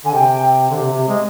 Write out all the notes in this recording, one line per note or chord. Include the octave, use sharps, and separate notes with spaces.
D3 G#5
C3 G5
D3
C3
C3
G#3